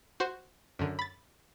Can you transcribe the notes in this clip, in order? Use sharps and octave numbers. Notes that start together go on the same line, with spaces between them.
F#4 C5
F#2 D3
B5 A6